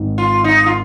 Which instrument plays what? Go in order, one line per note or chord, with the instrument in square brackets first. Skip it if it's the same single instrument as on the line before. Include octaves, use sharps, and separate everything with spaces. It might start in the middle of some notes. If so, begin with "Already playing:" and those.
Already playing: [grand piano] G#1 G#2 D#3
[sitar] F4
D#4
F4